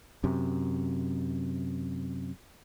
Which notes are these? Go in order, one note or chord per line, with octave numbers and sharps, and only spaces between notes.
F#2 C3